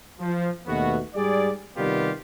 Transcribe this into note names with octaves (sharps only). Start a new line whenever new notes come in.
F3
D#2 B2 A3 B3 F#4
G#2 G3 G#4 D5
C3 D#3 G3 B3 F4 G4